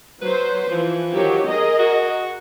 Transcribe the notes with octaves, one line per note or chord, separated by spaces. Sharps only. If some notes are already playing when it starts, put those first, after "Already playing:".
F#3 B4 C5
E3 F3
D#3 F#3 G4
G#4 A#4 D#5
F#4